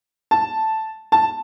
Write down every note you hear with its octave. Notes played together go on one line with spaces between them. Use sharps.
A5
A5